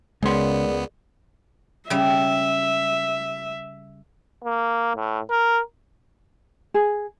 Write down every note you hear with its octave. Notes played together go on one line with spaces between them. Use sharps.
C#2 C#3 G#3 B3 G#4 A#4 D5 C6
C#3 G3 E5
A#3
A2
A#4
G#4